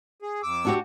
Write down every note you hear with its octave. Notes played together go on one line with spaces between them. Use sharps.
G#4
F2 D6 E6
D4 F#4 G4